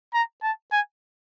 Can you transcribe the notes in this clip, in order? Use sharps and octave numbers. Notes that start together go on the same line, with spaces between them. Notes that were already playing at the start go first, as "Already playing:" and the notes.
A#5
A5
G#5